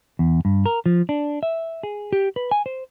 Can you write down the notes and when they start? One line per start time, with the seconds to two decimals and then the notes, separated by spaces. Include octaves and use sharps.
0.19 E2
0.45 G2
0.66 A#4
0.86 F3
1.09 D4
1.43 E5
1.83 G#4
2.13 G4
2.36 B4
2.51 G#5
2.66 C5